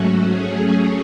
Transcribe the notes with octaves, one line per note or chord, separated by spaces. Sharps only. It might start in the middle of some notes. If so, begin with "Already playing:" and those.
Already playing: G#2 F#3 A3 C#4 F#4
F#3 A3 C#4 G#4